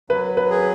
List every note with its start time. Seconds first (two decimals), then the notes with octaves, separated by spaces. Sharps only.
0.10 F#3 B4
0.37 B4
0.50 G#4